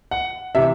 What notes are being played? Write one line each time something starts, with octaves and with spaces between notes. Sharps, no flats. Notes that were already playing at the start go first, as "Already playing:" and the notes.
F#5
C3 E3 E5